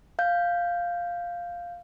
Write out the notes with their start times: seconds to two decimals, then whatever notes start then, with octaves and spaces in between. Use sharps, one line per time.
0.19 F5 G6